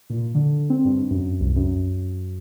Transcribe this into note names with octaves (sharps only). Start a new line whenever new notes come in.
A#2
D3
C4
G2
F#2
C2
F#2